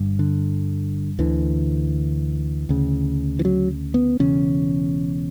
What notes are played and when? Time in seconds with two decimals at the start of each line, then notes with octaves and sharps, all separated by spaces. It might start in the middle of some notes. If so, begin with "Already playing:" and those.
Already playing: G1 G2
0.19 D3
1.19 D2 D3 E3
2.69 D2 C#3
3.39 E3
3.45 F#3
3.94 B3
4.19 E1 E2 C#3 C#4